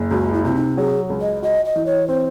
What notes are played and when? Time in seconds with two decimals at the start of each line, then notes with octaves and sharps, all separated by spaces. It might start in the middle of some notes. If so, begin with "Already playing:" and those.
Already playing: F#1
0.11 C#2 F#4
0.33 E4
0.44 C3 E4
0.55 D#4
0.77 F#3 G#4
1.10 C#2
1.21 D#5
1.42 F#4 D#5
1.65 D#5
1.76 E3
1.86 C#5
2.08 C4 C5